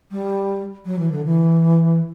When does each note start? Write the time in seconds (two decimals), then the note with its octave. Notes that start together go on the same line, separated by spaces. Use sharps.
0.11 G3
0.85 F#3
0.98 E3
1.11 D3
1.25 E3